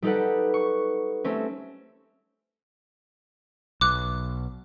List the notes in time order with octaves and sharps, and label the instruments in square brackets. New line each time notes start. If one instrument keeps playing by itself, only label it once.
[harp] G3 D#4 G4 A4 B4 F#5
C#6
A3 C4 C#4
[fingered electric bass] B1 [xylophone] D6 F#6